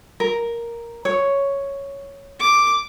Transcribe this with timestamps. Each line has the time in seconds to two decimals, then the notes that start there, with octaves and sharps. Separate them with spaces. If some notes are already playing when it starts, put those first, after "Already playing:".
0.20 A#4
1.05 C#5
2.40 D6